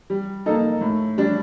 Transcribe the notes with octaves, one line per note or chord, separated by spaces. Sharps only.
G3
A#3 D#4 A4
A2
G3 D4